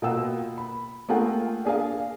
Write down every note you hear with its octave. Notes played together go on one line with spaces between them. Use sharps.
B2 A#3 F4 F#5 G5 E6
B5
A3 A#3 F4 G#4 F#5 G5
D4 G#4 A#4 F5